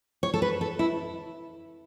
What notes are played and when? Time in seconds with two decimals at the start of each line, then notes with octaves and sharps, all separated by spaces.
0.23 C#5
0.34 A4
0.42 B4
0.61 A4
0.79 E4